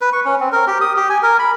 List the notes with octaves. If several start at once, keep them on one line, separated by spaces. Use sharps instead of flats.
B4
C#6
C#4
C4
A#4
G4
D#6
G4
G#5
A#4
B5